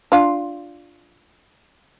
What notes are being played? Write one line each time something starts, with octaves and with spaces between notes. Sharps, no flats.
D4 F4